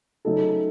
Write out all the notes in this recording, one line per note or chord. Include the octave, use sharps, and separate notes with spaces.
C#3 F#3 A3 D#4 A4